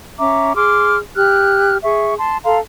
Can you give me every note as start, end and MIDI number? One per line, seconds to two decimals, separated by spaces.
0.19 0.55 61
0.19 0.55 76
0.19 0.55 82
0.19 0.55 86
0.56 0.97 68
0.56 0.97 84
0.56 0.97 86
0.56 0.97 89
1.16 1.76 67
1.16 1.76 89
1.16 1.76 90
1.83 2.14 68
1.83 2.14 76
1.83 2.14 85
2.18 2.38 81
2.18 2.38 84
2.44 2.58 69
2.44 2.58 77
2.44 2.58 82
2.44 2.58 84